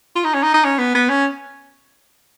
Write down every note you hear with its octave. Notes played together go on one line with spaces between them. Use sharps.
F4
D#4
C#4
D#4
D#4
C#4
B3
B3
C#4